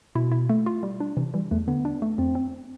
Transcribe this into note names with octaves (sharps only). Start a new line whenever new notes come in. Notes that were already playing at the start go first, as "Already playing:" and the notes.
B2 E4
E4
A3
F4
G3
D4
C3 E3
E3 G3
E2 A3
D3 B3
D4
A3
F2 C4
C4